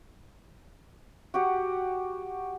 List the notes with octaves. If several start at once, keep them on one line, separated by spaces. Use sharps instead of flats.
F#4 G4 F#5